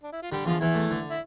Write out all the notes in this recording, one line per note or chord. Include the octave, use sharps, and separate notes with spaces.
D4
E4
F4
D3 G3 G4
E2 F3 F4
E2 E3 E4
A3
D3
E4